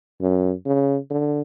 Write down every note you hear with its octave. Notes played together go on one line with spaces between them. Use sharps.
F#2
C#3
D3